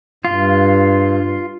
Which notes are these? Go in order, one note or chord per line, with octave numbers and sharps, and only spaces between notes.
G2 F4